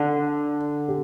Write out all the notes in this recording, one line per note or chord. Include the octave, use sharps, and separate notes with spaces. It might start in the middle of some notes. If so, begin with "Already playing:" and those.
Already playing: D3 D4
G4